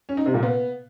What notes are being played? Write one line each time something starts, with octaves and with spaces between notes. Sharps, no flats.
C#4
D#4
C3
A#2
B3